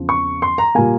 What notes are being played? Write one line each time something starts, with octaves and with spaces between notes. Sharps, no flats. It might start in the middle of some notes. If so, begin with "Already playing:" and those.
Already playing: E2 C#3 F3 C4
C#6
C6
A#5
A#2 G3 A#3 G#5